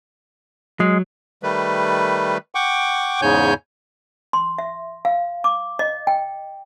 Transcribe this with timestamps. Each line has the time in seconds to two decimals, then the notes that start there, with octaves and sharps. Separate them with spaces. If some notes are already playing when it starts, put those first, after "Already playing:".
0.80 F#3 G#3
1.43 D#3 G3 A3 B4
2.55 F#5 G5 C#6 D6
3.22 E2 G#2 C#3 C#5 G#5 G6
4.33 C6
4.58 E5
5.05 F5
5.44 D6
5.79 D#5
6.07 G5